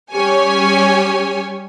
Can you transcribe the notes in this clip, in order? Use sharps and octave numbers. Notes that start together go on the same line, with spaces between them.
G3 C#4 G4 C#5 G#5